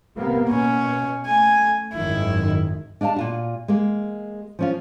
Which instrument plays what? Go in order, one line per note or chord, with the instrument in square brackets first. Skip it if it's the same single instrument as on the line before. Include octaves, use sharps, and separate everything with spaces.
[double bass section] C3 A#3 B3
[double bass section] B2 [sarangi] C#4
[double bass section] A3 [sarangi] G#5
[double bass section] G#1 F#2 D#3 [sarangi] E4
[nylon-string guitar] D4 D#5 F5 F#5 A5
A#2 F4 F#4
G#3 A#3
F3 C#4 F4